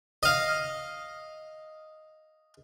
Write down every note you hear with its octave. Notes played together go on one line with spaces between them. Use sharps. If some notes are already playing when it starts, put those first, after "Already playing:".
D#5 F5